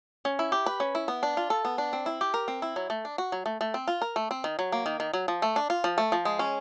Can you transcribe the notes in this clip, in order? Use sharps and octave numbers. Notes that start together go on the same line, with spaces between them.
C#4
E4
G4
B4
C#4
E4
B3
D4
F4
A4
B3
D4
C4
E4
G4
A#4
C4
E4
F#3
A3
D4
F#4
F#3
A3
A3
C4
F4
A#4
A3
C4
D#3
F#3
A#3
D#3
D#3
F#3
F3
A3
D4
F4
F3
A3
F3
G#3
C#4